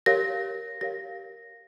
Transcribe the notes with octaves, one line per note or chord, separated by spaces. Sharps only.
G4 A#4 C#5 F5 A#6
G4 A#4 C#5 F5 A#6